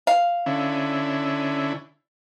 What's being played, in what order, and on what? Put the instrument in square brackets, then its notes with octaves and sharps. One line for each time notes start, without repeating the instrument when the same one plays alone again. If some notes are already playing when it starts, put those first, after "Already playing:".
[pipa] F5
[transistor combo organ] D3 C#4 E4